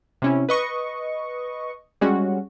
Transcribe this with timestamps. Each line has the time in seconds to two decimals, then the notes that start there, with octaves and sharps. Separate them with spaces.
0.22 C3 C#4 E4
0.49 B4 D#5 C#6
2.01 G3 G#3 C#4 F#4